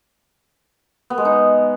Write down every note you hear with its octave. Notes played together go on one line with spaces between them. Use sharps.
B3
G#3
D#4